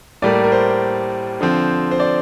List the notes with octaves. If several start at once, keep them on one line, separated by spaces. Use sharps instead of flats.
A2 G3 A#3 D5
A#4
C5
D3 F3 C4
C5
D5